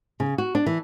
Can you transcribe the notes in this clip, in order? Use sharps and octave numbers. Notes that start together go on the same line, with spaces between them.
C#3
F#4
D4
E3